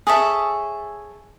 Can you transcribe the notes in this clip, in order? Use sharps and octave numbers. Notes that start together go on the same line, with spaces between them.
G#4 A4 C#5 E5